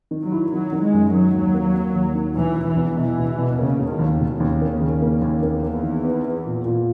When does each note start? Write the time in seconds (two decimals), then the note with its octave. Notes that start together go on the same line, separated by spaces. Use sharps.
0.11 D#3
0.22 F#3
0.32 E4
0.52 D#3 F#3
0.72 D#3
0.82 G#3
0.93 F#2
1.14 D#3 F#3
1.33 D#2
1.54 A#3
1.75 A#3
1.95 D#2
2.15 D#3
2.36 E1 E3
2.57 E1
2.67 E3
2.76 E2
2.97 B2 E3
3.18 E1
3.38 B2
3.59 C#3 A#3
3.79 E1
3.89 D#3
3.99 D#2
4.20 E1 C#3
4.40 D#2
4.61 A#3
4.81 D#2
5.02 A#3
5.22 D#2
5.42 E2 A#3
5.63 A#3
5.83 D#3
6.04 B3
6.24 B3
6.45 A#2
6.65 A#2